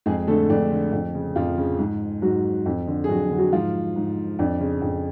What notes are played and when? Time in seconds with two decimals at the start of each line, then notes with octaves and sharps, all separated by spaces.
0.06 F2 G#3 G#4
0.27 D3 A3 A4
0.50 F2 D4
0.71 D3
0.93 F2
1.15 C#3
1.36 F2 F3 F4
1.58 C#3
1.79 G#2
2.22 G#2 F#3 F#4
2.66 F2
2.87 D3
3.04 G#4
3.08 F2 F#3 F#4
3.31 D3
3.38 F#3 F#4
3.52 G#2 F3 F4
3.96 G#2
4.39 F2 D4
4.60 C#3
4.82 F2